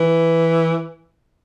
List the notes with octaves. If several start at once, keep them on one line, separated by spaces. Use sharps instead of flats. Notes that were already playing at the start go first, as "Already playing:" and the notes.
Already playing: E3